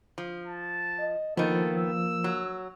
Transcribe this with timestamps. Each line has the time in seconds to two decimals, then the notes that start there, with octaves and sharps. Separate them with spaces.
0.18 F3
0.47 A5
0.99 D#5
1.37 D#3 F3 A#3 B3 A4
1.76 E6
2.24 F#3